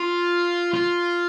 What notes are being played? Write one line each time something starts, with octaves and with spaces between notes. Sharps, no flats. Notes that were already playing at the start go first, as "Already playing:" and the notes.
Already playing: F4
F4